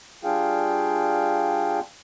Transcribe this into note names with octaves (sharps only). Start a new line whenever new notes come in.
G3 D4 F4 G#4 F5 G5